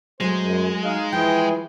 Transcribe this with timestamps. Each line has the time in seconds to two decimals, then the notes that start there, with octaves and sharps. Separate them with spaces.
0.20 F#3 G#3 A3 G#4 C5
0.40 F#2
0.85 D#4 D#5 F5
1.12 E3 F3 E4 G#4 G5